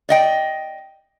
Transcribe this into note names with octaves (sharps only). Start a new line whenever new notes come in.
D5 D#5 G5